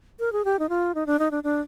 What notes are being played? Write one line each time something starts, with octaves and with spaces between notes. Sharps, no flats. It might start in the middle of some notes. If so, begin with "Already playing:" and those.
A#4
G#4
G4
D#4
F4
D#4
D4
D#4
D4
D4